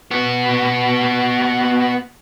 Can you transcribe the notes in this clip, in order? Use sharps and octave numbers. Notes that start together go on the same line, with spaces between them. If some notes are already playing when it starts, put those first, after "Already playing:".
B3 F#4